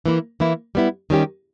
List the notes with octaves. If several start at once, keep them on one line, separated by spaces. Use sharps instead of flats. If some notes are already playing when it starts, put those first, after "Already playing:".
E3 A#3 E4
E3 A#3 E4
G3 B3 E4
D#3 G3 C#4 G4